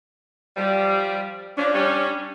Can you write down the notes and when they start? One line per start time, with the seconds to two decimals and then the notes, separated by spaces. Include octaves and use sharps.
0.57 F3 G3
1.58 F3 C#4 D4
1.74 G3 C#4
2.09 D4